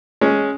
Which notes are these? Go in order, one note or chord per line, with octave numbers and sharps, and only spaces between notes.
G#3 C#4